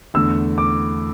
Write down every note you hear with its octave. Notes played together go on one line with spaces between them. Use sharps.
E2 D3 A3 E6
D6